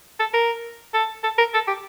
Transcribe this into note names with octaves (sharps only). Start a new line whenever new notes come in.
A4
A#4
A4
A4
A#4
A4
G4